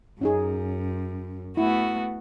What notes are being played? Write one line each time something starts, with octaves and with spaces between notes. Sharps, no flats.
F#2 C#4 D#4 G#4
A3 B3 E4 F#4